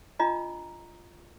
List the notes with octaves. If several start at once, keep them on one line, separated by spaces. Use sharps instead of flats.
D4 F4 D#5 A#5